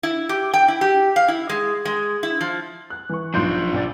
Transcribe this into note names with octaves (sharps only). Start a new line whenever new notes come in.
E4
G4
G5
E4
G4
F5
E4
G#3
G#3
E4
F3
F#6
E3 C#6
B1 F3 D4 F4 C6 G6
B1 D5 A6